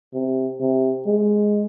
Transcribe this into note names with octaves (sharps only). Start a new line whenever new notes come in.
C3
C3
G#3